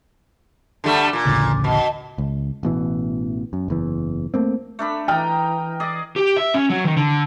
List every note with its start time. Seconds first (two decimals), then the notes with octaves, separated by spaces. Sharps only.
0.84 D3 G3 A3
1.13 A#2
1.26 A1 D2 C#3
1.64 B2
2.18 C#2
2.63 A1 B2 E3
3.53 F#2
3.68 F#1 E2 E3
4.34 A3 A#3 C4
4.79 A3 D4 B5
5.08 E3 D#5 G5 A#5 F6
5.80 G#4 D5 D#5
6.16 G4
6.37 E5
6.54 C#4
6.70 F#3
6.84 D#3
6.97 D3